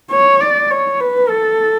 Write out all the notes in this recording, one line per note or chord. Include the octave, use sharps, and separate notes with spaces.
C#5
D5
C#5
B4
A4